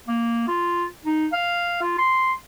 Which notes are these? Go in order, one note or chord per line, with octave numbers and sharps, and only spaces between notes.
A#3
F4
D#4
F5
F4
C6